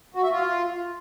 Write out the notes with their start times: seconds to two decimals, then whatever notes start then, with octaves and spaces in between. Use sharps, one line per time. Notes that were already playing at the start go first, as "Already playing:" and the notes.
0.14 F#4
0.23 E5
0.32 F4